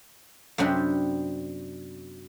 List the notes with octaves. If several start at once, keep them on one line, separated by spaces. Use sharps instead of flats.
F#2 C3 B3 C4 D4 G4